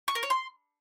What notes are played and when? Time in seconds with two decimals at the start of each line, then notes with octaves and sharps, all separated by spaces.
0.08 C#6
0.15 A#4
0.23 C#5
0.30 C6